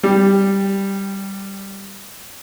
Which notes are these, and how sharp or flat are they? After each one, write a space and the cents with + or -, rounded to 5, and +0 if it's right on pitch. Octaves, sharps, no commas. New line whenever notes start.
G3 +0 G5 +15